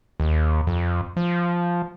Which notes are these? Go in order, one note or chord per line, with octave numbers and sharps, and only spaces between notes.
D#2
F2
F3